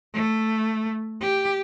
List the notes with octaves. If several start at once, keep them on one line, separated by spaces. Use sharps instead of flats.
A3
G4